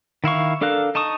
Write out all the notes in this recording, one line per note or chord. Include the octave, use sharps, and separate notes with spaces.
D#3 E4 F5 C#6
D4 A4 A#4 F5 F#6
D#4 A5 C#6 D#6